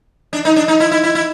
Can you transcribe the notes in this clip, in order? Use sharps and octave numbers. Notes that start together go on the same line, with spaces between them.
D4
D#4
D4
D#4
E4
E4
E4
E4